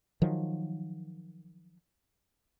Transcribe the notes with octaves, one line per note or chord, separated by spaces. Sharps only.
D#3 F3 F#3